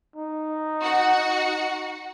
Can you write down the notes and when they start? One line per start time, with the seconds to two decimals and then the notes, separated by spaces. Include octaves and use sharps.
0.16 D#4
0.82 F#4 F#5 C#7